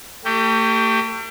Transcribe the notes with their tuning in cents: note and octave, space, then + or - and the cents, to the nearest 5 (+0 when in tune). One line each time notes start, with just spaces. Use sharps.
A3 +40 G4 +0